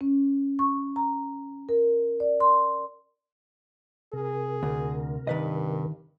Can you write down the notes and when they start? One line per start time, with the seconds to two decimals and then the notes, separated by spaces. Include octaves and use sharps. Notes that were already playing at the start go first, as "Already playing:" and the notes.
0.01 C#4
0.59 C#6
0.96 A#5
1.69 A#4
2.20 D5
2.40 C6
4.13 C3 G#4 A#4
4.63 D2
5.27 G2 D#3 B4 D#5